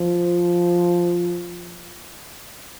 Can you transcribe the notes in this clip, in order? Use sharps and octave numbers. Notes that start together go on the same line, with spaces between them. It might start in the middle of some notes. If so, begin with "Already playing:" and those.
Already playing: F3